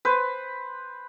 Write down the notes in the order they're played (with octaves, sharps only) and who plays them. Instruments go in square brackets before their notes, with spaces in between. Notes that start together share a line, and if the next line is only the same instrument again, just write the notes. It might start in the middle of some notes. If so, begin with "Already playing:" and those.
[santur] B4 C5